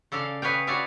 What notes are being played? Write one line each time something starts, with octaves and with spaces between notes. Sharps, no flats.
C#3 A4 D5 F5
G#4 B4 C#5 F5 G5
F#4 B4 C#5 D5 E5 F5